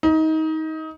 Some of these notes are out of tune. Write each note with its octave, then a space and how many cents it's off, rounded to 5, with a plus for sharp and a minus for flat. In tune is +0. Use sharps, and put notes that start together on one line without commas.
D#4 +25